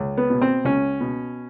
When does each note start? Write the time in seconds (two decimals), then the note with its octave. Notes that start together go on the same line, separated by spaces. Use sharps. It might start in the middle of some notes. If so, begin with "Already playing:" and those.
Already playing: C#2
0.17 B3
0.30 B2
0.42 C4
0.64 C#2 C#4
1.00 B2